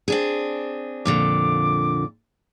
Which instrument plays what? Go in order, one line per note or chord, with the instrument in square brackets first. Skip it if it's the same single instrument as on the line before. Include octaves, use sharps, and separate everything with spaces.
[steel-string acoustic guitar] C4 D4 G#4
[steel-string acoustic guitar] F2 A#2 D3 [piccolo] D6